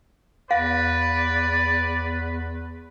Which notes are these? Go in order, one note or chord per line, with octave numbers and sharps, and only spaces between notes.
E2 B4 D5 F5